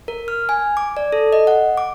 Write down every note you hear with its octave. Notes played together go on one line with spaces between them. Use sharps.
A#4
F6
G#5
D6
D5
A4
D#5
F#5
D6